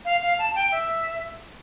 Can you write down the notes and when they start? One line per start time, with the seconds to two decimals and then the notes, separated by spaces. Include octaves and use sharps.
0.05 F5
0.22 F5
0.39 A5
0.56 G5
0.72 E5